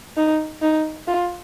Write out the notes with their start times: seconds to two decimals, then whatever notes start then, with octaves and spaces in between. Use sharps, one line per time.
0.17 D#4
0.61 D#4
1.07 F4